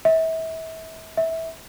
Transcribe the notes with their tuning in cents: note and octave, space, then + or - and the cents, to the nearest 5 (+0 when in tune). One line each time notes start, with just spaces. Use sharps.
E5 -30
E5 -15